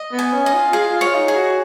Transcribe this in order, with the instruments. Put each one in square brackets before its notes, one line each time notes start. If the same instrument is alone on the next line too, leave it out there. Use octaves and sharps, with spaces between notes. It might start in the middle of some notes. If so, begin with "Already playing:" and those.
Already playing: [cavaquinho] D#5
[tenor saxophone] B3
[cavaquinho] G#5
[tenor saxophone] C#4
[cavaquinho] D#5
[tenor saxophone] F4
[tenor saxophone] F4 [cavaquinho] G#4
[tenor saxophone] F4
[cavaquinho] C#5
[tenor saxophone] F4
D#4
[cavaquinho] G#4
[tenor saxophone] F#4